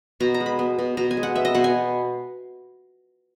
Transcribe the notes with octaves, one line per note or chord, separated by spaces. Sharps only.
B2 A#5
A#5
G#3
B5
B3
B2
B2 A#5
G#5
G#3
F#5
B3 E5
D#5
B2 F#5
G#5